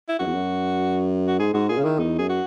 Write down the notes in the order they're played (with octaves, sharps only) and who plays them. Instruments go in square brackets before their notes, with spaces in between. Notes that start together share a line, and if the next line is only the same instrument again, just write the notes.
[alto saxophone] E4
[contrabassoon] F#2 [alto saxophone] F#4
[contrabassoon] E2
F#2
[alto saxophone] F#4
[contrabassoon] G#2 [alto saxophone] G#4
[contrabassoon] G#2 [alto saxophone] F#4
[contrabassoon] A#2 [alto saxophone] G#4
[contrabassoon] C#3
[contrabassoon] D#3 [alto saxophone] E4
[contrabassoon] E2 [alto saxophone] D#4
[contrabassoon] F#2 [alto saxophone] G#4
[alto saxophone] F#4